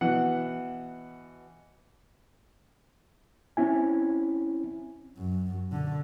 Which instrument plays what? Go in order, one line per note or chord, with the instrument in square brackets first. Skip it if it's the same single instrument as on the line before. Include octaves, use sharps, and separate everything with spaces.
[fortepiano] B2 E3 F#5
[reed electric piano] C4 C#4 E4 G#5
[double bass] F#2
D3